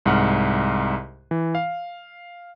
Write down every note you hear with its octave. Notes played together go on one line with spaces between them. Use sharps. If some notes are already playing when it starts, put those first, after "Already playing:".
C2 G#2 F#5 F6
E3
F5